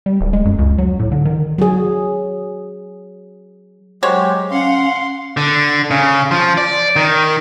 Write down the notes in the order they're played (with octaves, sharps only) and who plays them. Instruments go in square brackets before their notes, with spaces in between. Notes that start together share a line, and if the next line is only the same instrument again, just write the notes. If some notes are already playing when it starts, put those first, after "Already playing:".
[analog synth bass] G3
D1
G#3
F#2
C#2
F#3
A2
D3
D#3
[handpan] F#3 G#4
[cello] F#3 [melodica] G#3 G4 [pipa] F#4 C5 C#5
[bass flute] C#4 [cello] F5 F#5 [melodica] C6
[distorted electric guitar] D3
C#3
F3
D5
D#3